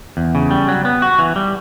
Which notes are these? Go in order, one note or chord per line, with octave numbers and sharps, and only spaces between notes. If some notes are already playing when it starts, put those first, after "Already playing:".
E2
C#3
G3
F#3
B3
F#4
E3
G3